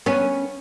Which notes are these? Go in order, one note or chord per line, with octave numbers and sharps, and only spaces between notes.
B3 C#4